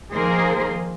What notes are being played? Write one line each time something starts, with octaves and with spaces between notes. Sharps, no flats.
D#3 F3 A#3 G#4 A#4 C5